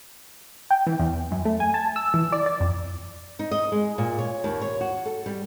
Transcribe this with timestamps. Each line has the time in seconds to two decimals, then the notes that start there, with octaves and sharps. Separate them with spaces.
0.71 G5
0.87 E3
0.99 E2
1.32 F#2
1.45 A3
1.60 G#5
1.74 A5
1.96 E6
2.14 E3
2.32 D5
2.46 D5
2.60 F2
3.39 D#4
3.51 D#5
3.72 G#3
3.98 A#2
4.18 C#5
4.44 D#2
4.62 C#5
4.81 F#4
5.05 A4
5.26 G3